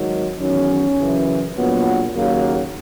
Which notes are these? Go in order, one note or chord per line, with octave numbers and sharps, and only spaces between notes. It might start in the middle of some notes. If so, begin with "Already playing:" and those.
Already playing: G#1 G#2 D#3 F#3
E2 D#3 F#3 C#4
F#2 C#3 E3
A#1 A#2 F#3 B3
D#2 C#3 F#3 A#3